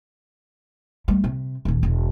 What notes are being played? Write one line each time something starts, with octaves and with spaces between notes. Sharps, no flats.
G3 A3
C3
D#1 D#2
E1